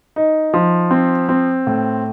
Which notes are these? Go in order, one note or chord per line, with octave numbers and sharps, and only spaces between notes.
D#4
F3
C4
C4
A2